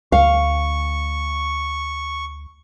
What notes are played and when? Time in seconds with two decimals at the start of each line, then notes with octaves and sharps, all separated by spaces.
0.12 D2 F5 C#6